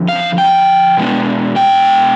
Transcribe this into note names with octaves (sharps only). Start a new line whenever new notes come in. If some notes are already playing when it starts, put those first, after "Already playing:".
Already playing: F2 D3 F3
F5
G5
B2 G#3 B3 D4
G5